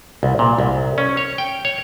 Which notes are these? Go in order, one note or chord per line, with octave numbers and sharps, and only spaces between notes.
C2
A#2
C2
C#4
C#5
G5
C#5